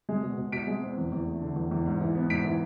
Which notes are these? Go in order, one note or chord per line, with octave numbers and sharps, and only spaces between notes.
G#3
B2
B2
B2 B6 D7
G#3
C4
E2
E2
A3
D3
E2
E2
G#2
E3
B3
G#2 B6 D7
E3